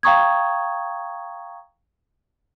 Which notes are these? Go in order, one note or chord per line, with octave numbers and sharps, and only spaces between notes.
F5 G5 A#5 C#6 D#6 G#6